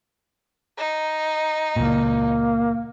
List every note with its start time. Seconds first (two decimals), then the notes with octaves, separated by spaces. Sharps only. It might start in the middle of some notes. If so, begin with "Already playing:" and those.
0.77 D#4
1.76 C#2 A#2 A#3